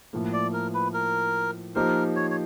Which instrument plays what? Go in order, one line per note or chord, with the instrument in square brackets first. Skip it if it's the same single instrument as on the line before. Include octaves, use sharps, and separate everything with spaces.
[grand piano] A2 F3 A#3
[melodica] D5
A#4
B4
A#4
[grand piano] F3 A#3 D#4 G4 C5 [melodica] A#4
[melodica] C#5
C#5